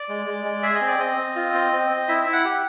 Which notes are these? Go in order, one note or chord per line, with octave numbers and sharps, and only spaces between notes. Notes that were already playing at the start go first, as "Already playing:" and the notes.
Already playing: D5
G#3
G#3
G#3
G#4 E5
D#5
C4
D5
C4 D#5
C4
F4
C4
C4
C4
E4 E5
E4
F#5
G4